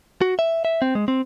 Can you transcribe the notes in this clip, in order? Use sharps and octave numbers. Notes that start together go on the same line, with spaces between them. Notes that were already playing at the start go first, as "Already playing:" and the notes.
F#4
E5
E5
C4
G#3
C4